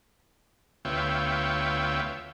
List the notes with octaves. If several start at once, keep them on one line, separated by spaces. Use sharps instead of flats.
D2 B3 F4 C#5 E5 G5